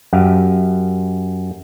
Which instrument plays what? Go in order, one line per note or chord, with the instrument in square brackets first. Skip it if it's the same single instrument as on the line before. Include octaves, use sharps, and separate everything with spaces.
[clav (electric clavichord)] F#2 G4 F5